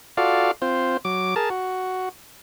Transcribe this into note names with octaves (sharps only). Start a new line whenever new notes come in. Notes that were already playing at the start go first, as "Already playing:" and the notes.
F4 F#4 A4 D5 F5
C4 F4 C5
F#3 D6
G#4 A#4 A5
F#4